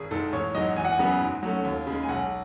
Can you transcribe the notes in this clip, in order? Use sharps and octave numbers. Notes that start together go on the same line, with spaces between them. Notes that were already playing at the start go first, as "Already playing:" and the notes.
Already playing: G#1 G#4
G#2 D#3 A4
A1 C#5
G#2 D#3 F#3 D#5
E2 G#5
F#5
G#5
C#3 F#3 B3
G#2
F#3 A3 C#4
D#2
C#3 G#3
G#5
B1 F#5